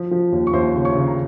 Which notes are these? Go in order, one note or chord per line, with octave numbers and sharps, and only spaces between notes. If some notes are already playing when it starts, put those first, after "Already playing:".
Already playing: F3
F3
D#2
C#6
D#2 C5 C6
C#3
C#5 C#6
C#3
A#5